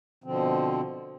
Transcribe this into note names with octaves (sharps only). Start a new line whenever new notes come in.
B2 D3 F3 C4